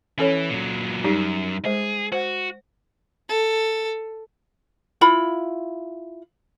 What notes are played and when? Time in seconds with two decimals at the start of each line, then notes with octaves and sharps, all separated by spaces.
0.19 E3 C#4 A4 C#5
0.50 A#2 F#3
1.04 F#2 G3 D#4 G4
1.65 G#3 G#4 C5
2.12 F#4 C5 F#5
3.29 A4
5.01 E4 F4 B5